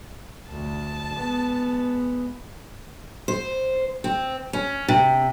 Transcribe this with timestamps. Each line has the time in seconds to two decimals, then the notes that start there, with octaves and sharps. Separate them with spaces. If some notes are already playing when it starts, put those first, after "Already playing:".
0.50 D2 A5
1.13 G#3 B3
3.28 C5
4.04 C4
4.53 C#4
4.88 C3